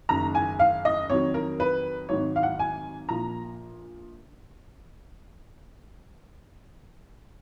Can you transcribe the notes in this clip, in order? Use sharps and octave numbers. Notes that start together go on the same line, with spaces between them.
F#1 F#2 D#3 A#5
G#5
F5
D#5
F2 D#3 F#3 C#5
A#4
B4
G#1 G#2 D#3 F#3 C#5
F5
F#5
G#5
A#1 A#2 F3 A#5